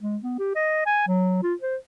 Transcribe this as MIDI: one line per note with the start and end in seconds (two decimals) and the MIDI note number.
0.01 0.17 56
0.23 0.35 59
0.39 0.56 67
0.56 0.83 75
0.86 1.05 80
1.08 1.38 54
1.43 1.54 65
1.62 1.76 72